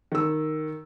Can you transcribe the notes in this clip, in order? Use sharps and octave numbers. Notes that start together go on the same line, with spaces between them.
D#3 E6